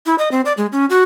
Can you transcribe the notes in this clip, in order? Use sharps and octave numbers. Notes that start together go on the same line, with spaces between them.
E4
D#5
C4
D5
G#3
C#4
F#4